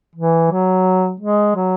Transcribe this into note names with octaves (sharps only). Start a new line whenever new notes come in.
E3
F#3
G#3
F#3